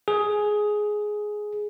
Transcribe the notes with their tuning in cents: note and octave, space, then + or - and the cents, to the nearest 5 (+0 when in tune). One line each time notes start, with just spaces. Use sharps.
G#4 +10